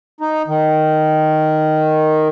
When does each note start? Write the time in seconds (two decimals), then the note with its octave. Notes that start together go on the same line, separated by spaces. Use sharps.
0.21 D#4
0.48 D#3